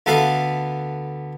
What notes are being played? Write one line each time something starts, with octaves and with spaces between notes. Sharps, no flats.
D2 B3 A4 B4 F5 B5